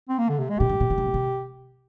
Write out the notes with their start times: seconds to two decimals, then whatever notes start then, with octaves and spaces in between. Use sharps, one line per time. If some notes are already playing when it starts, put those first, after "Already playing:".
0.09 C4
0.19 A#3
0.29 D3
0.39 C3
0.50 G#3
0.59 A#2 G4
0.70 G2
0.80 A#2
0.90 D3
0.98 C3
1.06 A#2
1.14 C3